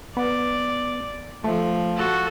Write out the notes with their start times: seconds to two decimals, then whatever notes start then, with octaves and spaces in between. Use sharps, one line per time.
0.17 B3 D5
1.44 F3 A3
1.97 F#4 A4